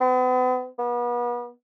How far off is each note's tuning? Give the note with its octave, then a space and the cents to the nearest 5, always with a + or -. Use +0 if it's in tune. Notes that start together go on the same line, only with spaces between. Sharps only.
B3 +40
B3 -35